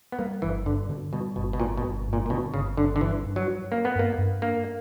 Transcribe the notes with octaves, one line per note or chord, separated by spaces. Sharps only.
B3
G3 A#3
G1 E3
G2 D3
B2 D3
B2 G3
G1 B2
B2
G1 A#2
B2
G1
G2
A#2
A#2
B2 D3
G1 C#3
G1 D3
D3
G2 E3
G2
F#3
F#3
A#3 C#4
B3
G2 A#3
G2
A#3 D4